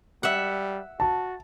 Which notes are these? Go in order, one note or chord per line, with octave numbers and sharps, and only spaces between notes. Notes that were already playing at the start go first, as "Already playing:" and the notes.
G3 E5 F#5
F#4 A5